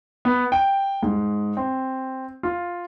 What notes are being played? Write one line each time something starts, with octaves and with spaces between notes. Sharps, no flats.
B3
G5
G#2
C4
F4